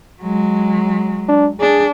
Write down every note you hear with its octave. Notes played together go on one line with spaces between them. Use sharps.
F#3 G#3
D4
D4 G#4